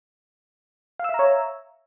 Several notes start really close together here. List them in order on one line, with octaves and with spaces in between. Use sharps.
F5 E6 E5 A#5 C#5